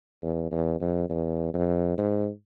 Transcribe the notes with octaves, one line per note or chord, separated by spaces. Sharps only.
E2
E2
F2
E2
F2
G#2